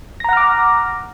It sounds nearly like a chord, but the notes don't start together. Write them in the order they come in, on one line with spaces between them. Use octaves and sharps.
A#6 A#5 F#5 F6 D6